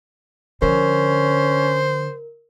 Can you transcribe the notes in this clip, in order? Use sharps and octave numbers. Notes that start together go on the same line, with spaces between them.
D3 F3 C#4 A#4 C5